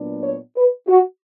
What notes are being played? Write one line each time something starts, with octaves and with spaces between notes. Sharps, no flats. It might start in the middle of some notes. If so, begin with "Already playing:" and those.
Already playing: A#2 F#3 B3 D4
C#5
B4
F#4